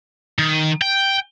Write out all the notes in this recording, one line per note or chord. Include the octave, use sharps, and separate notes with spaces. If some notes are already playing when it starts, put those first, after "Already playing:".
D#3
G5